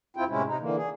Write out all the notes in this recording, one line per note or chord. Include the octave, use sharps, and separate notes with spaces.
F2 C4 E4 F4 G5
A2 C3 G#3 C#4 E4
C3 D#4
D3 E3 A#3
G#4